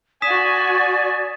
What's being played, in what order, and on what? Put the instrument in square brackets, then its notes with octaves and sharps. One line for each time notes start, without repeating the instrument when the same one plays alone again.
[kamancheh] F#4 G#5 [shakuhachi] D5 [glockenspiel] D#6 B6 E7